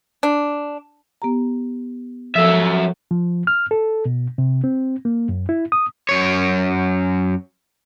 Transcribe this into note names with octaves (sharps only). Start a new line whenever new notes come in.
D4
B3 G4 A#5
F3 F#3 A4 E5 E6
F3
F6
A4
B2
C3
C4
A#3
F#2
E4
D#6
F#2 C#5